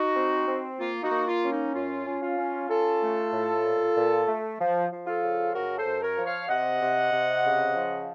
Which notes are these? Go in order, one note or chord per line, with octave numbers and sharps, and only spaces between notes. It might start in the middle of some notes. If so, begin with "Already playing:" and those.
Already playing: D#4 F#4
C4
C4
A#3 F4
D#4 F#4
A#3
F4
C#4
D#4
F#2 F4
C#4
F4
C#4
C#4 F4 A4
A3
A2
A#2
A#2
A3
F3
F3
F4 A4
C#3
F#2 F#4 A#4
A4 C5
F#2
A#4 C#5
F3
C#5 F5
C3 D#5 F#5
C3
C3
C#3
F3